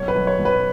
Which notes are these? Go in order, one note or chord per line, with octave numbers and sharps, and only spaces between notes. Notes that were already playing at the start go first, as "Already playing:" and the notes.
Already playing: B1 C#5
B4
B1
C#5
B1
B4